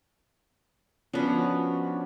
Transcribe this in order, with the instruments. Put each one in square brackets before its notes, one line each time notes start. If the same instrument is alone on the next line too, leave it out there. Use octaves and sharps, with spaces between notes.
[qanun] F3 B3 [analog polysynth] C#4 D4 F#4